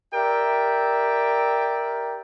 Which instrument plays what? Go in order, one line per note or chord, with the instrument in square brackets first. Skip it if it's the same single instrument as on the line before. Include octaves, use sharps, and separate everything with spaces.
[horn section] G4 A#4 D5 E5 G5